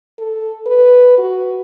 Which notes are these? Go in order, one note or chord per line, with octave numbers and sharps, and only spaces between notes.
A4
B4
F#4